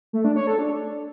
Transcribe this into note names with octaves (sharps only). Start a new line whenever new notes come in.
A3
D4
C#5
A4
D4